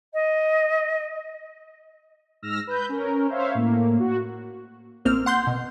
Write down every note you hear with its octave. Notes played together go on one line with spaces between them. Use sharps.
D#5
G#2 E6 F6 A#6
B4 G6
C#4 A#4
C5 C#5 E5 F5
A2 A#3
F#4
A1 A#3 C4 F6
F#5 C6 G6
B2